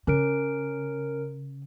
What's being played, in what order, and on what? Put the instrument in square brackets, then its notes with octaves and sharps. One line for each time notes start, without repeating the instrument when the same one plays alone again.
[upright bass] C#3 [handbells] C#4 A#4 D7